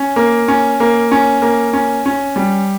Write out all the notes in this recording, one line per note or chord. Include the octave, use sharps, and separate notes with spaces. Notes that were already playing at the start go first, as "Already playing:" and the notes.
Already playing: C#4
A#3
C#4
A#3
C#4
A#3
C#4
C#4
G3